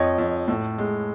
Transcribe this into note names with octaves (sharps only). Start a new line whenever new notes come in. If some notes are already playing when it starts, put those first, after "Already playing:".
Already playing: F2 C#5 D#5
F2
A2
G#3